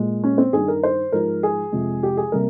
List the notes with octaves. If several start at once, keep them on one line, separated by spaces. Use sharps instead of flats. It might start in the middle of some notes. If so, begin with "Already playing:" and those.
Already playing: A#2 G#3
C#4
C4
G2 D#3 G3 G#4
A#4
C5
G#2 F3 G#3 A#4
G#4
F2 C3 F3 G#3
G4
G#4
C3 G3 A#3 A#4